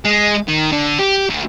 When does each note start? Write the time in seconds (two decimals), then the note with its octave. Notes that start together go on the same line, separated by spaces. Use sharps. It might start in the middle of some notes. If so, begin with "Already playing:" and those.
0.05 G#3
0.48 D#3
0.72 D3
0.99 G4
1.29 D2